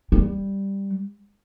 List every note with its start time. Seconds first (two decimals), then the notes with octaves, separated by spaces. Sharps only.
0.12 G3